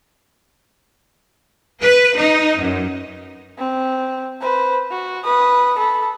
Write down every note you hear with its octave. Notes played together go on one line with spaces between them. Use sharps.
B4
D#4
F#2
C4
B4 C5
F#4
B4 D#6
A4 B5